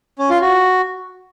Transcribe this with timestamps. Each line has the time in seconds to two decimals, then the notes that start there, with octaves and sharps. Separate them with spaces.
0.19 C#4
0.30 F4
0.41 F#4